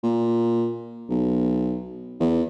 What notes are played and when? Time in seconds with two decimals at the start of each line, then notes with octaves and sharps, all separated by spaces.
0.03 A#2
1.10 B1
2.20 E2